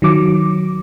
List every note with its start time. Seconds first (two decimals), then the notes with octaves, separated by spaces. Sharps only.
0.02 D#3 F#3 D6